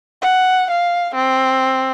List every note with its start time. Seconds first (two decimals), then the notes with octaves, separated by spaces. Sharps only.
0.22 F#5
0.70 F5
1.15 C4